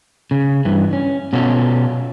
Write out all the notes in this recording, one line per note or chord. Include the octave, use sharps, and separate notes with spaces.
C#3
G2 E3
C#4
B2 C#4 F4 F#4 A4